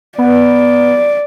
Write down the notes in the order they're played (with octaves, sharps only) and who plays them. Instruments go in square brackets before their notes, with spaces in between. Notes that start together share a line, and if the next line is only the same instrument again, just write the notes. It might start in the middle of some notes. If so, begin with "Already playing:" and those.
[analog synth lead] B3 [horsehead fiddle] D5